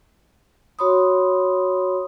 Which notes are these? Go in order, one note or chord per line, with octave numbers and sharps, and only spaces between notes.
F#4 C#5 B5 C6 D#6